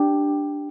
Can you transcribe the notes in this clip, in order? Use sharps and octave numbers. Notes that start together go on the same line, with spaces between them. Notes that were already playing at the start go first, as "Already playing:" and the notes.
Already playing: D4 G4